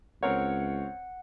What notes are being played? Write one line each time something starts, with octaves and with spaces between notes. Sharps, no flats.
C#2 C4 A#4 C#5 F#5